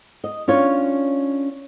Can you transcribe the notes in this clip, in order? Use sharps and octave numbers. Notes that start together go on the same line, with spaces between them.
D#5
C#4 D4 F4 C#5